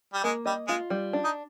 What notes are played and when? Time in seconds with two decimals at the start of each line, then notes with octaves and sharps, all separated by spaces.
0.13 G3
0.24 G#3 A#3
0.46 G3 D#5
0.68 G#3 F4
0.90 G3
1.13 D4
1.24 D#4